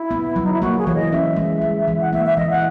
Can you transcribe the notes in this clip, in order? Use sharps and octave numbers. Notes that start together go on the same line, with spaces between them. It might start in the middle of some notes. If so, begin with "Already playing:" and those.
Already playing: E4
B3
F#3
D#4
E4
A#3 F#4
G#4
E3 C#5
D#5
C#4 E5
G#3
G#3
E3
F#5
A#3 E5
E5
E3 D#5
F#5